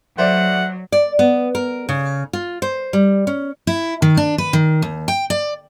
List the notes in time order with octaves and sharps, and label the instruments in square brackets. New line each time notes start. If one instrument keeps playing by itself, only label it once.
[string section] F#3 [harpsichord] A3 [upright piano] C5 D5 [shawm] F#5
[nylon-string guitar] D5
B3
A#4
C#3
F4
C5
G3
C#4
[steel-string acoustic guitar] E4
D#3
D4
B4
D#3
D#2
G5
D5